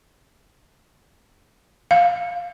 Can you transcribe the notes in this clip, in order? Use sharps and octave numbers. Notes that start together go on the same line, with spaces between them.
F5